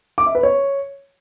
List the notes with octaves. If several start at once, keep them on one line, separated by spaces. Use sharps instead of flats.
D6
E5
B4
C#5